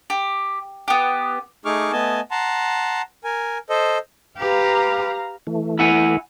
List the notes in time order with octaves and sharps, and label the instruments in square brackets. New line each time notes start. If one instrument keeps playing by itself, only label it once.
[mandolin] G4
B3 G4
[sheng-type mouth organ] A3 D#4 G#4 C#6 D6 F6
A3 B3 D#5 G#5 A5
F#5 A5 A#5 C6
A#4 G#5
A4 C5 D#5
[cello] G4 B4 [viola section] F5 A#5
[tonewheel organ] E3 A3
[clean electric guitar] E4 F#5 G#5